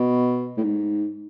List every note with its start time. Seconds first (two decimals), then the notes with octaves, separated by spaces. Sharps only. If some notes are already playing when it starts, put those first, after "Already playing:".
Already playing: B2
0.58 A2
0.63 G#2